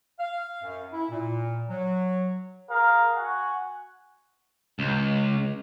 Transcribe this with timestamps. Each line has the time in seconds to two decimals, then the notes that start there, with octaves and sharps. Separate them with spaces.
0.19 F5
0.63 F#2
0.93 E4
1.09 A#2
1.70 F#3
2.69 G#4 A#4 F5
3.15 F#4 F#5 G#5
4.79 C#2